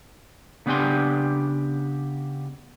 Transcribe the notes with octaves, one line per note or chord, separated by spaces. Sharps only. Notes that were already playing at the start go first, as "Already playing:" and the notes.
C#3 B3 D4 G4 G#5 C6